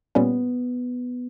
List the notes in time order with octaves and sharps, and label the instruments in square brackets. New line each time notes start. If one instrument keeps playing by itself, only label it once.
[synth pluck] A#2 G3 C#4 [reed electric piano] B3